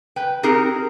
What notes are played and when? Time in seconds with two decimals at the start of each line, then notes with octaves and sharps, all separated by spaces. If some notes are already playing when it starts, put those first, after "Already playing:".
0.16 B4 G5
0.43 C4 D#4 G4 G#4 A#4